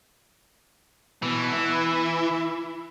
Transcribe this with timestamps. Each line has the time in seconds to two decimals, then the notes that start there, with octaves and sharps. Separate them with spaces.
1.22 B2 E3
1.52 E4